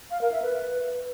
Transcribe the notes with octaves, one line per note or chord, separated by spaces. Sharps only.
F5
A#4
E5
B4